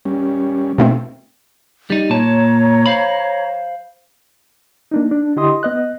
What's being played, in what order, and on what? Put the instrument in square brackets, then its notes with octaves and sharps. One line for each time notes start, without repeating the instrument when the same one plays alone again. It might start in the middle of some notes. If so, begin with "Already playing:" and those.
[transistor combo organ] G3 C#4
[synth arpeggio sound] B2 A3 C4
[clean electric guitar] G3 D#4
[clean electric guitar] A#2 A5 [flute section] C#5 A#5
[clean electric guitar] C5 F5 B5
[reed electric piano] A#3 D4 D#4
D4
D3 E4 G4 D#5 C6 D#6
B3 D#5 F#6